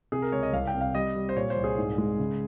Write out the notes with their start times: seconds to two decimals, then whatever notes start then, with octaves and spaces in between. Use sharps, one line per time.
0.12 C3 G#4
0.22 A#4
0.32 C#2 C#5
0.43 D#5
0.53 C2 F5
0.67 G5
0.74 C3
0.81 F5
0.95 G3 D#5
1.15 G3
1.29 C5
1.36 A#2 C#5
1.50 C5
1.56 C2
1.64 G#4
1.78 G#2
1.98 G#3
2.19 C#3